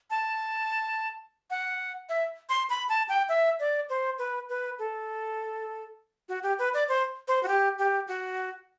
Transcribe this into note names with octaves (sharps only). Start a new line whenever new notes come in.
A5
F#5
E5
C6
B5
A5
G5
E5
D5
C5
B4
B4
A4
F#4
G4
B4
D5
C5
C5
F#4
G4
G4
F#4